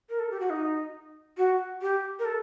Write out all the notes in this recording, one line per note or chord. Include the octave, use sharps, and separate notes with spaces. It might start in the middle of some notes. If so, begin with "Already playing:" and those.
A#4
A4
G4
F#4
D#4
F#4
G4
A#4
A4